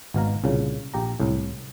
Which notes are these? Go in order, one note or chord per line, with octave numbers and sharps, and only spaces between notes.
G#1 B2 F5 A#5
C2 A#2 C#3
A#1 G4 A#5
C2 A2